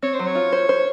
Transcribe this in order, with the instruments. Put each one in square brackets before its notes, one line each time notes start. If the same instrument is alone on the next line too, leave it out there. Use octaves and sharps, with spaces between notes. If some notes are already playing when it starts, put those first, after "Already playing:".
[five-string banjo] C4 [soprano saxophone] C#5
[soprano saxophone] C5
[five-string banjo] F#3
[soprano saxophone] C#5
[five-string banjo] F4
C5
C5